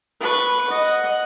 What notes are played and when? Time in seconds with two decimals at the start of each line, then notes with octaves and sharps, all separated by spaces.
0.20 B4 C#6
0.68 D#5 F#5